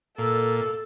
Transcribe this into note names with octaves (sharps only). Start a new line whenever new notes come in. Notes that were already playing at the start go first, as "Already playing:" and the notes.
A#2 A4